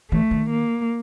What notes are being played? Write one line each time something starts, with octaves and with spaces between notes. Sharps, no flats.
E3 A3
D#3
A#3